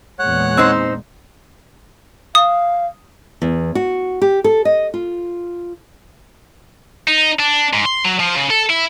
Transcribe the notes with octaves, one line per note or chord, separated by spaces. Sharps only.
E2 A#2 G#3 C#5 F#5 F#6
C4 D#4 C5
F5 D#6
E2
F#4
G4
A4
D#5
F4
D#4
D4
G#2
C6
F#3
F3
C#3
A4
E4